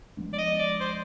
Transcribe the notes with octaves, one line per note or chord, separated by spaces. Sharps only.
F3 G#3 B3 D4
D5
D#5
D5
C5